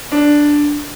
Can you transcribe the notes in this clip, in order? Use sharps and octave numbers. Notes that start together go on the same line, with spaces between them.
D4